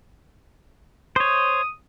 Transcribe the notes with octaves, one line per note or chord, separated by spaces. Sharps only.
C5 C#5 D#6